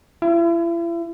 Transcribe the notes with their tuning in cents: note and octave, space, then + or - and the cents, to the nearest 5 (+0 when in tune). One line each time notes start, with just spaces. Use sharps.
E4 +40